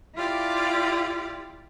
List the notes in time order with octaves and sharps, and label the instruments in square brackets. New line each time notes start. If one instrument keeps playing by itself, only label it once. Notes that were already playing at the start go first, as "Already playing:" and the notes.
[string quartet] E4 F4 G4 D5